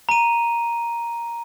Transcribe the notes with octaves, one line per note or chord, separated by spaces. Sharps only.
A#5 D#7